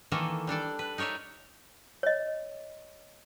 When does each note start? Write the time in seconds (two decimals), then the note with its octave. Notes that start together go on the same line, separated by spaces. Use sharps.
0.12 D#3 E3 A#3 A4
0.47 G3 D4 A4 D5
0.79 B4
0.98 D#4 A#4 C#5 D5 E5
2.03 C#5 D#5